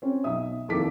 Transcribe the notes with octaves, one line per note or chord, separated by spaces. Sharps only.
C4 C#4
B1 E5 D#6
F1 D#2 E4 A4 D6 B6